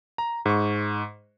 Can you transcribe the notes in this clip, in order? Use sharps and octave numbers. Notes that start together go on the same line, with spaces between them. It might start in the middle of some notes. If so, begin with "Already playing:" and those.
A#5
G#2 C#6